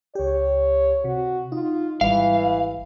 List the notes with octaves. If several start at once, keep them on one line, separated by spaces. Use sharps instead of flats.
C#2 G4 C#5
C3 F#4
D#4 F4
G#1 E3 G3 F5